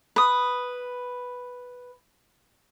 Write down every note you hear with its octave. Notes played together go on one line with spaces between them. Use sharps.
B4 D#6